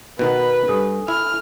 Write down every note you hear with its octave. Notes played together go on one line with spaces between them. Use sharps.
B2 D#3 B3 B4
G2 A4 G#5 D#6
E4 F6